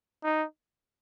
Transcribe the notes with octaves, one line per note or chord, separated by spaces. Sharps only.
D#4